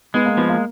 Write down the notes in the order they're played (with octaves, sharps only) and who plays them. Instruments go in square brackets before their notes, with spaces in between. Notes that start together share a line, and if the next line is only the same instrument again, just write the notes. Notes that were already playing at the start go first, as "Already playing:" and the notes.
[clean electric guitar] G#3 [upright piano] B3
[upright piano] A#3
[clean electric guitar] F3 [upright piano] B3
[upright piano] A#3